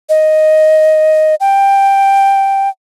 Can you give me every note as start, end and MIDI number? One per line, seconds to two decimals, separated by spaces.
0.09 1.35 75
1.40 2.69 79